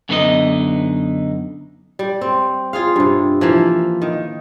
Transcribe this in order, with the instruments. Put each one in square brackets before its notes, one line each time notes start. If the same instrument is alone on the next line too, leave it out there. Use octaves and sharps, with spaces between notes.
[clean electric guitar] F#2 D3 B3 D#4 F#4 D#5
[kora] G3
C4
F4 G#4 F5
G2 C3
E3 F3 A#3
D#3